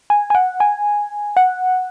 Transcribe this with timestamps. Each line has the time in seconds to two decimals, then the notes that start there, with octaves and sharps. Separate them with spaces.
0.10 G#5
0.30 G#5
0.35 F#5
0.60 G#5
1.37 F#5